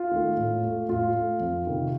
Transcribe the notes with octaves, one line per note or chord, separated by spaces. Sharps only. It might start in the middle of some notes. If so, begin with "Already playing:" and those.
Already playing: F4
D#3 A3
A2
A3
A2 F4
A3
F2
C3 D#3